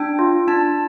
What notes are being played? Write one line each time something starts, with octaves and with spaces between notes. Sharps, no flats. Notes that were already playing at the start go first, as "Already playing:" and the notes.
Already playing: D4 G5
F4
D4 A5